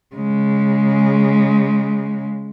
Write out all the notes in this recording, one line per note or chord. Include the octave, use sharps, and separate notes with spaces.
C#3 G#3